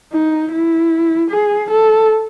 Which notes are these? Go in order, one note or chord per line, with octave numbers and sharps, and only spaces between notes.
D#4
E4
G#4
A4